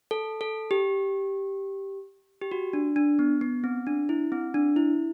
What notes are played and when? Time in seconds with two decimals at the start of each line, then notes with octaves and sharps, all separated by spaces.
0.11 A4
0.41 A4
0.71 G4
2.42 G4
2.52 F#4
2.73 D4
2.96 D4
3.19 B3
3.41 B3
3.64 C4
3.87 D4
4.09 E4
4.32 C4
4.54 D4
4.76 E4